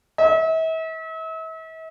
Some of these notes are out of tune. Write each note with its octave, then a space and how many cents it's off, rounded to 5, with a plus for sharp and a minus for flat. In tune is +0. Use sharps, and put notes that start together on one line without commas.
E5 -40